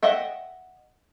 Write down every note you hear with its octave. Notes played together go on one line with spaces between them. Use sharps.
D#5 E5 F#5 G5